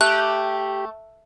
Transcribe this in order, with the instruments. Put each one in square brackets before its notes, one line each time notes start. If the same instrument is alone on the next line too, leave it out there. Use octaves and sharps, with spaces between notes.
[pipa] A3 [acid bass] G4 [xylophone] F#6